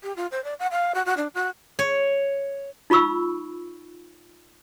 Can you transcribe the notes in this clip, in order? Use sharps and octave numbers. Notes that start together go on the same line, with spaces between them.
G4
F4
C5
D5
F#5
F5
F#4
F#4
D4
F#4
C#5
D#4 F4 B5 C#6 E6